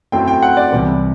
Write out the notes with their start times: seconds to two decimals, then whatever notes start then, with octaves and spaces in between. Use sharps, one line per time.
0.12 F#2 F#3 A3 C4 E4 G5
0.28 G5
0.43 F#5
0.57 D5
0.72 C2 C3 E3